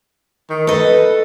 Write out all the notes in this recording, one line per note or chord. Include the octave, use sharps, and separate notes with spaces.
D#3
A4 B4 D#5